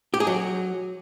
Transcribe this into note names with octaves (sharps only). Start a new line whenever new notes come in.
G4
G#4
F#3